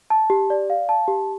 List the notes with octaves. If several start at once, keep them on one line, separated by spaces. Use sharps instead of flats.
A5
G4
D5
F5
A5
G4